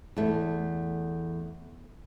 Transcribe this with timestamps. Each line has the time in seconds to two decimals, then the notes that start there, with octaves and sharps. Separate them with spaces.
0.17 E2 A3